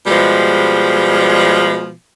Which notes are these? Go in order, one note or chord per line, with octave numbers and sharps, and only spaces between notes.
B2 F3 G3 G#3